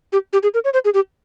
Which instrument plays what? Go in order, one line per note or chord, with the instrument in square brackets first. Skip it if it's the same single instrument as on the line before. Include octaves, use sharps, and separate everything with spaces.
[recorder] G4
G4
G#4
A#4
C#5
C5
G#4
G4